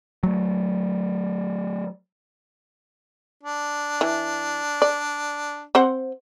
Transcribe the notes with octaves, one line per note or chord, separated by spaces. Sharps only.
F#3 A3
D4
E3
D5
C4 C5 F#5